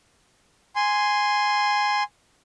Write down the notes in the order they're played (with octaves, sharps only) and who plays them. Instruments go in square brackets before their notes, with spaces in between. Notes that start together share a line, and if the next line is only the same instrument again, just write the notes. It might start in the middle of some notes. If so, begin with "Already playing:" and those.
[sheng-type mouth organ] G#5 C6